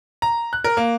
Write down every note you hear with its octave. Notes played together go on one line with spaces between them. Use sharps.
A#5
F#6
A#4
A#3